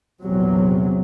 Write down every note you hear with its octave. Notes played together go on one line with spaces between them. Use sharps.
A#1 E2 C3 F#3 C4